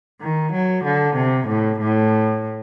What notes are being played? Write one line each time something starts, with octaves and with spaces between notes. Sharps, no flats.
D#3
F#3
D3
C3
A2
A2